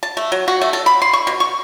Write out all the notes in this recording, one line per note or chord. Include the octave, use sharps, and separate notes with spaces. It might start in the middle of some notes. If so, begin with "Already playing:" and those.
A5
A3
F#3
F#4
A3
A4
B5
C6
C#6
B2
C#6